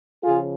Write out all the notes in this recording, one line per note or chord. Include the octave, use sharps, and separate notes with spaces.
C#3 F3 F4 G#4